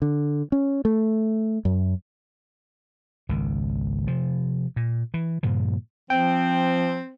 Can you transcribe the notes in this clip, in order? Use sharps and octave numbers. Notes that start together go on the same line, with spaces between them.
D3
C#4
A3
F#2
G#1 C#2 D#3
C3 F3
A#2
E3
G2 A#2 C#3 F3
F3 C4 G5